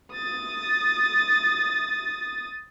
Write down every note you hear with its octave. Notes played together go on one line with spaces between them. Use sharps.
D#6 A6